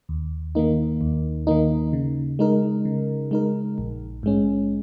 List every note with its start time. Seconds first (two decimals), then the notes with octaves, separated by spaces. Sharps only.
0.09 D#2
0.55 D#3 A#3 D#4
1.01 D#2
1.47 D#3 A#3 D#4
1.93 C#3
2.39 G#3 D#4 A#4
2.85 C#3
3.31 G#3 D#4 A#4
3.78 A#1
4.23 G#2 G#3 C#4